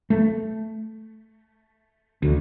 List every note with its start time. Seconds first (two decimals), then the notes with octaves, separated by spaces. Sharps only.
0.10 A3
2.22 D2